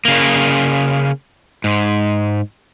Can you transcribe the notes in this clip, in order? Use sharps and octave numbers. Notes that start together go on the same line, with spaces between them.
C#3 A#3
G#2